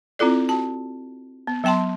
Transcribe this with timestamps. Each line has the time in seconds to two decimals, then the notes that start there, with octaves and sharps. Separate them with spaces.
0.19 C4 E4 F4 A4 D5
0.49 F#4 A5
1.47 B3
1.64 F#3 B3 G5 A5 C6